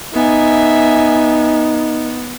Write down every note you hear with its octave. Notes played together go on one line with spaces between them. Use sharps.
B3 D#4 E5 G#5